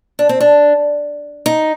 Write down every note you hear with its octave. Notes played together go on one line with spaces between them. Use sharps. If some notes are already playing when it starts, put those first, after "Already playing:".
D4
C4
D4
D#4